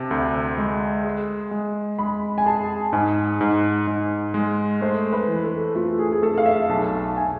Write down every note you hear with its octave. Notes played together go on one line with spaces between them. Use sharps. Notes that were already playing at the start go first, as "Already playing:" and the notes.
Already playing: C3 A5
D2
G#3
G#4
G#3
G#3 B5
G#5
G#4 A5
G#2 G#5
G#2
G#2
G#3
A3 C5
B4
E3
A4
A3 F4
G#4
G#4
A3 A4
F5
E5
B1 A5
G#5